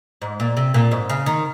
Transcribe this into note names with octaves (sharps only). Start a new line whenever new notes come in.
G#2
A#2
C3
A#2
G#2
C#3
D#3